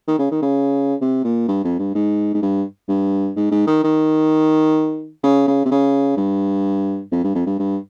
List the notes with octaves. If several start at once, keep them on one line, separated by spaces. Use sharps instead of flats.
D#3
C#3
D#3
C#3
C3
A#2
G2
F2
G2
G#2
G#2
G2
G2
G#2
G#2
D#3
D#3
C#3
C#3
C3
C#3
G2
F2
G2
F2
G2
G2